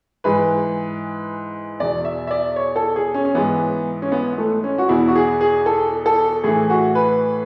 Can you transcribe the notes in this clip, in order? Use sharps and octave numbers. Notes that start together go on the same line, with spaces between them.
G#2 E3 B4
E2 B2 D5
E5
E5
D5
C#5
A4
G#4
C#4
C#4
G#2 E3 B3
C#4
B3
A3
C#4
F#4
E2 B2 E4
F#4
G#4
G#4
A4
A4
A2 E3 G#4
F#4
B4